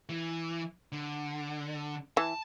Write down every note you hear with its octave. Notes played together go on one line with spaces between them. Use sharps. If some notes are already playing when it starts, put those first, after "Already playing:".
E3
D3
E3 A5